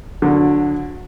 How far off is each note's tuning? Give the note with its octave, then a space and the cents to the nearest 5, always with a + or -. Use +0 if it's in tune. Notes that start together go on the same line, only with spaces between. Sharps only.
D3 +0 F#3 -30